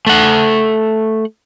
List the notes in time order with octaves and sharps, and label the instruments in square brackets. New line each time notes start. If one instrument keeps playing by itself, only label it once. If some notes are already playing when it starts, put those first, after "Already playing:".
[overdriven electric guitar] A3 F#5